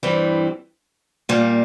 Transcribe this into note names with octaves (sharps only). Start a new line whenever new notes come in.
G2 E3 G3 C4
A#2 G3 A#3